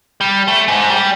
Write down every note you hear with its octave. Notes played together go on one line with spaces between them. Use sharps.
G3
A3
G#2
G3